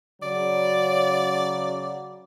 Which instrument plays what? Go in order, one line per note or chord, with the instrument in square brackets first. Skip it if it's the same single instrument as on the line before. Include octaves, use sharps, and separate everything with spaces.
[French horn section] C#3 F#3 [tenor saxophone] D5